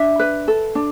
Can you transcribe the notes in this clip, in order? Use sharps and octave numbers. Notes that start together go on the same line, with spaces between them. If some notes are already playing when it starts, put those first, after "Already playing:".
Already playing: D4 E5
B4
A4
D4